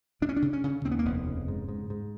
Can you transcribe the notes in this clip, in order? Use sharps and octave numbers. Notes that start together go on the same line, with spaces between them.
C#3 D4
C#4
D4
C#3
C#4
C#3
D#2 C4
B3
A#3
F1 B3
C#3
G#2
G#2
G#2